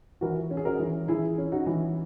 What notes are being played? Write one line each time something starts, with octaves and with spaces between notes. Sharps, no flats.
E3 F#4 A#4
C#4
G#4
F#4 A#4
E3
E3 E4 G#4
C#4
D#4 F#4
E3